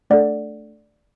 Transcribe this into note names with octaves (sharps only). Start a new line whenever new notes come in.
A3 D4 A4 D5 F#5